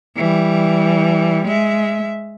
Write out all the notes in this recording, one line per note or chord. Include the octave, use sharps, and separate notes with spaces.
E3 G3
G#3 E5